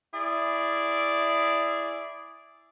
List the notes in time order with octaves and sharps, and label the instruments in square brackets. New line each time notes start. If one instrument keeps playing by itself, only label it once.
[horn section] E4 G#4 D5